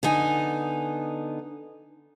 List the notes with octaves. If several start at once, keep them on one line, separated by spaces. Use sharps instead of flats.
D3 B3 D#4 G#5